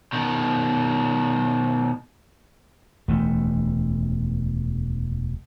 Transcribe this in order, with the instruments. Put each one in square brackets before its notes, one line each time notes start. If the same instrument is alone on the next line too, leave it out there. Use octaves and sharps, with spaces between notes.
[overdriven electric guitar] B2 D#3
[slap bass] E1 D2 A3